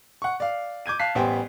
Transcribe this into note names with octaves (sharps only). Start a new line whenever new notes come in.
F#5 C#6
D5 F5
D6 G6 G#6 D#7
F5 A5 F#6 B6 C7
A1 G3 B3 C5 G5 G#5